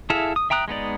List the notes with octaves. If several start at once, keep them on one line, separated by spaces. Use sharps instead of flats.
E4 G#4 A4 E5 F5
D#6
E5 G5 A#5 D#6 F#6
G#3 B3 D#4 D5